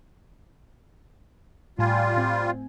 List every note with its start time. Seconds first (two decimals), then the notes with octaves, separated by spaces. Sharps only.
1.79 A2 G3 F4 G#5
2.16 A2 C4